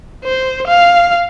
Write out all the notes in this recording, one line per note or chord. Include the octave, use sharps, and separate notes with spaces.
C5
F5